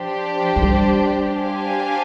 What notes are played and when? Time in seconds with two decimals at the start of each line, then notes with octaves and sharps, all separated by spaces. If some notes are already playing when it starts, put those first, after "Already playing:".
Already playing: F3 D4 G4 C5
0.56 F3
0.62 G3
1.38 D4 G4 C5 F5 G#5